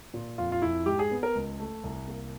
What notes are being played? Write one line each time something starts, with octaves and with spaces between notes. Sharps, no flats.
A#2
F2 F4
F4
F2 E4
G#2 G4
G#4
B3
A#4
C#2
A3
C2
A#3